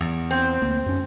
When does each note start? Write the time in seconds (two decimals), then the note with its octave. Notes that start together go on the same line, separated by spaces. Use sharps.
0.01 E2
0.31 C4
0.62 D2 A#3
0.86 F#2 C#4